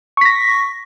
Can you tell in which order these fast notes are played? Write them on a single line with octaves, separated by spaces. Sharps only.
C#6 B6 A#6